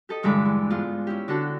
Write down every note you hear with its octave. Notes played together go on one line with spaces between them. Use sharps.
G4 A4 D#5
E2 G2 D3 G#3 B5 D6
E4
G#2 B3 D4 F4
C#4 E4 G4
D3 D4 F#4 A4